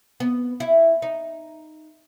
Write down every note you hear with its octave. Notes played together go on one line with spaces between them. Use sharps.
B3
E4
D#4